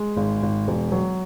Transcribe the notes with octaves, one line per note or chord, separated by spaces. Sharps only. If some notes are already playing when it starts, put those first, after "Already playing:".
Already playing: G#3
G#1
G#1
E1
F#3